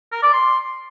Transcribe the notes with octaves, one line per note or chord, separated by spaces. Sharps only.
A#4
D5
C6